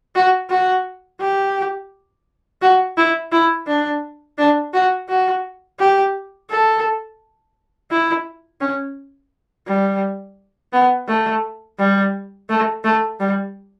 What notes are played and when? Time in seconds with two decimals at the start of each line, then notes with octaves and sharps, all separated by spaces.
0.15 F#4
0.50 F#4
1.21 G4
2.62 F#4
2.97 E4
3.32 E4
3.67 D4
4.38 D4
4.74 F#4
5.09 F#4
5.79 G4
6.50 A4
7.91 E4
8.61 C#4
9.68 G3
10.73 B3
11.08 A3
11.79 G3
12.50 A3
12.84 A3
13.20 G3